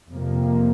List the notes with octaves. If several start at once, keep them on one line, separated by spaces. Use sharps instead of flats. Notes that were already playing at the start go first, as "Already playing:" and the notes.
F2 C3 F3 A#3